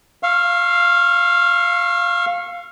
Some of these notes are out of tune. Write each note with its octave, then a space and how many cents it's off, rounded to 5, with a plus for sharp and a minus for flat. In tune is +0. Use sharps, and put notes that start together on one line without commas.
F5 +0 C#6 -30 E6 +45